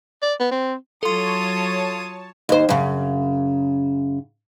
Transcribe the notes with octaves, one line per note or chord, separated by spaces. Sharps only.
D5
B3
C4
F#3 F4 A4 C#5 A5 C6 D#6
D#2 C5
F#2 C#3